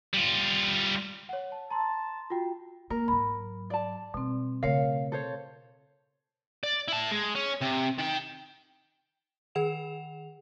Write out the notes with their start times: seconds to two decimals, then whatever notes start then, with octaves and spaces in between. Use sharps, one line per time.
0.14 G3 F4
1.29 C#5 F#5
1.52 A5
1.71 A5 A#5 C6
2.30 F4 F#4 G5
2.90 A#3 A#4
3.08 G#2 F#3 B5
3.70 D5 A5
4.14 B2 G3 C4 D#4
4.63 C#3 A3 A#4 C#5 F5
5.12 A4 C5 C#5
6.63 D5
6.88 E4 A5
7.11 G#3
7.35 C#4
7.62 C3
7.98 D#3 G5
9.55 D#3 G#4 F#5 E7 F7